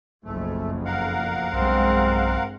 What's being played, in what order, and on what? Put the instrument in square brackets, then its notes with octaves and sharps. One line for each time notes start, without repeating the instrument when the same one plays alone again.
[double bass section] F#1 B1 F2 [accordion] A3
[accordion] A#4 F5 F#5
[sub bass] B1 [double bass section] E2 G2 G#3 [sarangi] C4